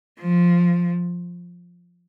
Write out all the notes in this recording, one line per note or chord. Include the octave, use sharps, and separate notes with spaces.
F3